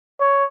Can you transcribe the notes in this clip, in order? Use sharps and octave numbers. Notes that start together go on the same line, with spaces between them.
C#5